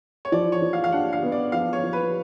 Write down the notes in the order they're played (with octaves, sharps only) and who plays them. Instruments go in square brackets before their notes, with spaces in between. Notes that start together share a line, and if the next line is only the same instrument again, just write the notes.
[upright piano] C#5
[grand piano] F3 [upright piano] D5
[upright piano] C#5
[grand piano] F3
[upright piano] F5
F5
[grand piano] D4 [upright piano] F#5
[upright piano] F5
[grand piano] B3
[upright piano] D5
[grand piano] F3 [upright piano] F5
[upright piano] C#5
[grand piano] F3
[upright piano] B4